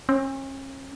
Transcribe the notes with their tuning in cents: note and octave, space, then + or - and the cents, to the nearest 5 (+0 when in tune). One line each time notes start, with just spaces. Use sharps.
C#4 -40